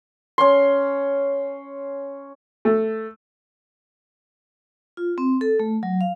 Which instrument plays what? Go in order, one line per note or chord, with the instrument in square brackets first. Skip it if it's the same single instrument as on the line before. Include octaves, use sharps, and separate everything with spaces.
[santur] C#4 C6
[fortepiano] A3
[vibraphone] F4
C4
A4
A3
F#3
F5